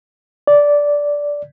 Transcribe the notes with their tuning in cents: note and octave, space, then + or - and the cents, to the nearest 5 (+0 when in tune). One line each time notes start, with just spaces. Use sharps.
D5 -10